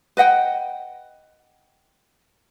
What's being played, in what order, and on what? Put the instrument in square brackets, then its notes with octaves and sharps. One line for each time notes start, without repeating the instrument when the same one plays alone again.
[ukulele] B4 D#5 F#5 G5